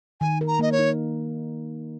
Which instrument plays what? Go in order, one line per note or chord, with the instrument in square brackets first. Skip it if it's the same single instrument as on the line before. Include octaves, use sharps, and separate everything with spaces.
[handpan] D#3 [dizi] G#5
[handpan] A#4
[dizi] A#5
[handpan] A#3 [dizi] D#5
[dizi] C#5
[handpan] D#4